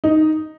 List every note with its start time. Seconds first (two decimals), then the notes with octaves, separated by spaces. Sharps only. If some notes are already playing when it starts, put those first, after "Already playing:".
0.04 D#4